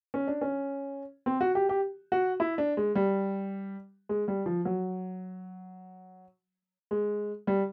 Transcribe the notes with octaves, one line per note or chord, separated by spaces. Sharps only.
C#4
D4
C#4
C4
F#4
G4
G4
F#4
E4
D4
G#3
G3
G#3
G3
F3
F#3
G#3
G3